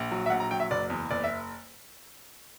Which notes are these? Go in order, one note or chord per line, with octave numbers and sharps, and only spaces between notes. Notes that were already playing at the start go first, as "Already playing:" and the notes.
Already playing: A#1
F#3
E5
A#1 F#5
A#5
F#3 G5
E5
F#1 D5
E2
F#1 D5
E5